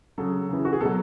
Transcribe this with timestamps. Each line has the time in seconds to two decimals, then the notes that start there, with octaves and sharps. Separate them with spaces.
0.18 C#3 F#3 A4
0.49 C#3 E3
0.65 F#4
0.73 G#4
0.80 B2 F#3 A4